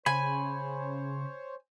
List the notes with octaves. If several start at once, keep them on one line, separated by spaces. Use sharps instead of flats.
C#3 C5 C#5 G#5 B5